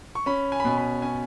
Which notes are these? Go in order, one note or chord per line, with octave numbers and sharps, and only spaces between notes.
C#6
C#4 B5
G#5
B5
B2 G#5
B5
C#4 G#5